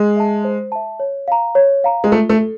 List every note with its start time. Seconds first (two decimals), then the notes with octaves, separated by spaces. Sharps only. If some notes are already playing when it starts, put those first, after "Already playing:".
Already playing: G#3
0.16 E5 A5
0.44 C5
0.72 E5 A5
1.00 C#5
1.28 F5 A#5
1.55 C#5
1.84 F5 A#5
2.04 G#3
2.11 A3 F4
2.29 A3
2.39 A4